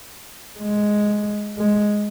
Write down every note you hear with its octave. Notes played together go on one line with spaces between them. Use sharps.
G#3
G#3